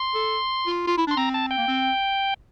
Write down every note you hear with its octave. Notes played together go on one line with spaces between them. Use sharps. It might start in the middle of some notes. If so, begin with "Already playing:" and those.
Already playing: C6
A4
F4
F4
E4
D4 C6
C4 A#5
A5
G5
A#3
C4